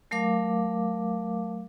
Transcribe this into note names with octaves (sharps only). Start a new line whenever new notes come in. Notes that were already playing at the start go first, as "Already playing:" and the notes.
F#3 A3 A#4 F5 D6